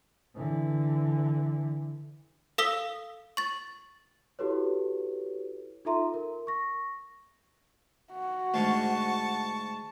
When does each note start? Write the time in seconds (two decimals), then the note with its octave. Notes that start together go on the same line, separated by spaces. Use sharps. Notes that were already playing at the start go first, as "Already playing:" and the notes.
0.36 D3 E3
2.58 A4 F5 D#6 E6 B6 G7
3.37 C#6 A6
4.39 E4 F#4 G4 A4 B4 C#5
5.85 D#4 F4 A4 E5 A#5 C6
6.14 A#4
6.47 C#6 A#6
8.13 F#4
8.54 D2 G#2 A5 C#6